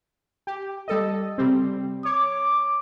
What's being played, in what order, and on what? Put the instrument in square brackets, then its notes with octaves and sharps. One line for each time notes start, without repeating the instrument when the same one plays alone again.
[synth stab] G4
G3 A4 D#5
C3 G3 C4
[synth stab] C#5 [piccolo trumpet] D6